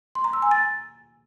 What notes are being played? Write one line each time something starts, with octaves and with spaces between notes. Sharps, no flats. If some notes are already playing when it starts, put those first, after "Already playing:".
C6
A#5
E6
G#5
A6